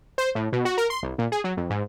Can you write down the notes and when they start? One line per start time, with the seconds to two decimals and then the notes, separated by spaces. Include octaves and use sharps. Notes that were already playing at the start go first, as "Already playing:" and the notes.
0.18 C5
0.35 A2
0.52 B2
0.65 F#4
0.78 A#4
0.90 C6
1.03 C2
1.18 A#2
1.32 G#4
1.44 F#3
1.57 F2
1.70 G#2